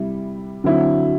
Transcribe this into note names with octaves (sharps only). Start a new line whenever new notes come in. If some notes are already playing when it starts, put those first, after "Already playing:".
Already playing: C3 G3 E4
D3 F#3 C4 E4